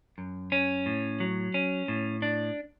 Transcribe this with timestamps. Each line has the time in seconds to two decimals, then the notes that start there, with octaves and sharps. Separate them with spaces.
0.18 F#2
0.52 C#4
0.86 A2
1.20 F#3
1.54 C#4
1.88 A2
2.22 D4